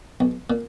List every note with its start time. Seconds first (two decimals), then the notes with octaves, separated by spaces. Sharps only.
0.20 B1
0.50 A#2